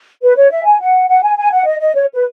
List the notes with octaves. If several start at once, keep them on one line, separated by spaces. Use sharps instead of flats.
B4
C#5
E5
G#5
F#5
F#5
G#5
G#5
F#5
D#5
D#5
C#5
B4